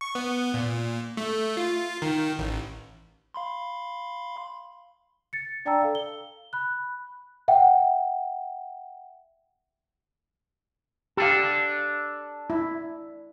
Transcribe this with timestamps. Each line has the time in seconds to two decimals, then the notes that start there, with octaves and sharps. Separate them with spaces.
0.01 C#6
0.15 B3
0.54 A#2
1.17 A3
1.57 F4
2.02 D#3
2.39 A1
3.34 F5 B5 C6
5.33 A6 C#7
5.65 D4 D5 G5 A5 A#5 E6
5.82 A4 F5
5.95 G7
6.53 B5 F#6
7.48 E5 F#5 G5
11.17 D4 G4 A4 F5
12.50 E4